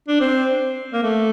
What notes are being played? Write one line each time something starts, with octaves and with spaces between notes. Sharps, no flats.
D4
C4
A#3
A3